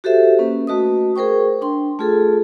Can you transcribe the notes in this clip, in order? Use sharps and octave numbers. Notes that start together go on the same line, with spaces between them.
F#4 G4 A4 C5 E5
A#3 C#4 B4
A3 F#4 B4 D#5 D#6
G#4 A#4 C5 G5 C#6
D4 G5 C6
A3 F4 G#4 A4